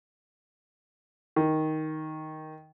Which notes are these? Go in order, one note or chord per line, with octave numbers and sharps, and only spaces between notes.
D#3